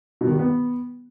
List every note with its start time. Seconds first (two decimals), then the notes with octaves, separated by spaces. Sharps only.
0.21 B2
0.27 D#3
0.33 G3
0.39 B3